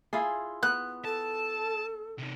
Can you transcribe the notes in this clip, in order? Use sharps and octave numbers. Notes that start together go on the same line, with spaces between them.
E4 F4 G#4
B3 F#6
A4 A5
C3 D#4